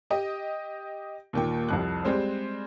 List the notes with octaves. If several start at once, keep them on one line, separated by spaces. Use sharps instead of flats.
G4 D#5 G5
D#2 A#2 G5
C2 F2 F#6
G3 G#3 C4 C5